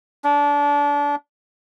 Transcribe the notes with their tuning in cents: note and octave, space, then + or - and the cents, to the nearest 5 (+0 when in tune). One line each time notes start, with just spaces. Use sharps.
D4 -25